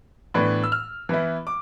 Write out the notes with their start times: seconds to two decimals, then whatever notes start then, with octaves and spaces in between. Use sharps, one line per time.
0.34 A2 E3 B3 D4
0.64 E6
0.72 F6
1.09 E3 B3 E4
1.47 D6